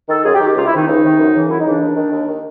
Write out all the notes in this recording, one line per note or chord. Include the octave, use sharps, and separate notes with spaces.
D#3 A4
F#2 G#4
G4
D#3
G4
C#2 F4
E4
C3 D#3 D#4
C#2 D#4
C3 D#3
F#2
C#3 E3
F#2 E4
D#4
C#3 E3 D4
D#2
D#3
D#2
D#3